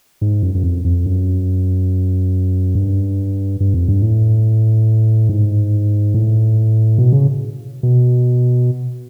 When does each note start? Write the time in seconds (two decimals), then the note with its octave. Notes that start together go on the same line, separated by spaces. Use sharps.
0.21 G#2
0.43 F#2
0.55 F#2
0.63 F2
0.84 F2
1.06 F#2
2.75 G2
3.60 G2
3.74 F2
3.88 G2
4.02 A2
5.29 G#2
6.14 A2
6.98 B2
7.12 C#3
7.83 B2